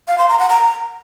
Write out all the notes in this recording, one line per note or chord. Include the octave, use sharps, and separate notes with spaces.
F5
C6
A#5
F#5
A#5